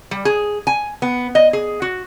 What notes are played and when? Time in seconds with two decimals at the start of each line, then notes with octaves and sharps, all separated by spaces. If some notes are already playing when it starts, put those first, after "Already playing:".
0.11 G3
0.25 G#4
0.67 G#5
1.02 B3
1.35 D#5
1.53 G#4
1.82 F#4